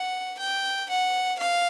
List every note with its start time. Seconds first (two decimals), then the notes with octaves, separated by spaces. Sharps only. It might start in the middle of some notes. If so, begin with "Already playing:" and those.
Already playing: F#5
0.39 G5
0.89 F#5
1.39 F5